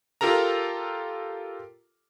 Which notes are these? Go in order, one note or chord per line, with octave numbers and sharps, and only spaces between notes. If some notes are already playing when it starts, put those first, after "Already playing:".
F4 G4 A4 A#4 A#5